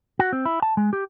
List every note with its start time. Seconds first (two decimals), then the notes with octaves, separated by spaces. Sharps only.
0.19 F#4
0.33 C4
0.45 E4
0.62 A5
0.77 G#3
0.93 G4